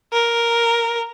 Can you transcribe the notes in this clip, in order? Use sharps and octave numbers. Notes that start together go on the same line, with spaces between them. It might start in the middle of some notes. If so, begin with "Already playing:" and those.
A#4